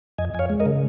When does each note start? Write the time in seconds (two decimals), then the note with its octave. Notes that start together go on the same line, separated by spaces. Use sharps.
0.18 F2 D#5 G#5
0.34 F2 G#5
0.39 C#5 F5
0.50 G#3
0.60 A#4 D#5
0.66 C#3